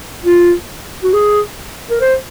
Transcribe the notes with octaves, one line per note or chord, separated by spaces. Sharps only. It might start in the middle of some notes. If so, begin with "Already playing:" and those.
F4
F#4
G#4
A#4
C5